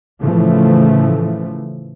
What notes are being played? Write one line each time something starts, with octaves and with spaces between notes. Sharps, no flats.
A2 C#3 E3 F3 A3